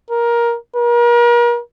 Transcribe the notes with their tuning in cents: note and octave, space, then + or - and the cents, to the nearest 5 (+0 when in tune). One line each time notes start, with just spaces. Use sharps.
A#4 +15
A#4 +40